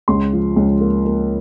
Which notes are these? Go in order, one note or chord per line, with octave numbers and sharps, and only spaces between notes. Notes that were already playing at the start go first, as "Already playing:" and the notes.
C#2 C6
F3
C#2
A#3
A#3